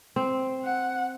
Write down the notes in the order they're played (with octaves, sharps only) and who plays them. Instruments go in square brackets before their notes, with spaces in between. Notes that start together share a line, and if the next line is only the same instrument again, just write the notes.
[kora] C4
[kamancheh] F#5